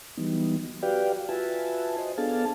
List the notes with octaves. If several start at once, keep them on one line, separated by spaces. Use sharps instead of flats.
E3 F#3 G3 B3 D#4
F#4 G4 B4 D5 F5 G5
F4 F#4 B4 E5 G#5 A5
C5 D#5
B3 D4 G#4 A4 F5 A5